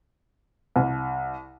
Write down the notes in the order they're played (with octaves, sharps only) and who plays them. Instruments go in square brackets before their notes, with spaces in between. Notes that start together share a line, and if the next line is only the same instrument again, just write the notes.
[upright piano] C2